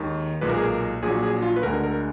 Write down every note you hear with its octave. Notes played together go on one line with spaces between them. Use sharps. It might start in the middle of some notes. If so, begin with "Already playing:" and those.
Already playing: D#2 D#3 G#3
B1 A#2 G#3 B4
A#4
G#4
A#4
A#1 A#2 F#3 A#3 G#4
G#4
F4
B4
D2 D3 G#3 A#4
A#4